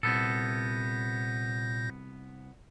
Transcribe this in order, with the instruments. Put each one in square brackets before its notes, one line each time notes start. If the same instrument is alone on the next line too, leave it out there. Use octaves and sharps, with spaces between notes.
[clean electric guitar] C2 B3 A4 [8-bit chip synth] A#2 G6 A#6